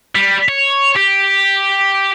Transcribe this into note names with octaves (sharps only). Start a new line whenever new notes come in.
G3
C#5
G4